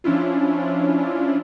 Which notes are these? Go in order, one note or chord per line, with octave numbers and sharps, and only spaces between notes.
F3 C#4 D4 E4 F4